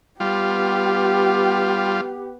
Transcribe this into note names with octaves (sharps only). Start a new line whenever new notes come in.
G3 B3 F4 G4